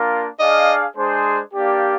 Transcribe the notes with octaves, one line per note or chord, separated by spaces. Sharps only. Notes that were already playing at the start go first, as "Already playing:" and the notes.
Already playing: A#3 D4 F4 A#4
D4 G#4 D5 D#5 F5
G#3 D4 G#4 C5
A#3 D4 G4 D5 F5